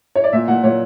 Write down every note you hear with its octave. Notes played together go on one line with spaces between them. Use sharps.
C#5
D5
A#2 E5
A#2 F#5
A#2 C#5